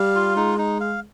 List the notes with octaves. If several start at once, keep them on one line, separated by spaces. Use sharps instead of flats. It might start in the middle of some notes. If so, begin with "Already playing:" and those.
Already playing: G3 F5
F4
G#3 D#4
D#4
F5